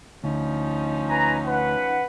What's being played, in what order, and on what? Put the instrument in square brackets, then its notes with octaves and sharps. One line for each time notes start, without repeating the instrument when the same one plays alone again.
[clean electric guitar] D2 [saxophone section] F3 C#4 D#4
[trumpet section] B4 G#5 A#5
B4 F#5